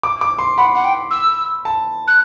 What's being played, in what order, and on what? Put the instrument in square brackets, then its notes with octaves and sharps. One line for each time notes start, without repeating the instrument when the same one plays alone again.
[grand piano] D6
D6
C6
[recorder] F#5 [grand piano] B5
[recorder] F#5
G5
E6
[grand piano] A5
[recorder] F#6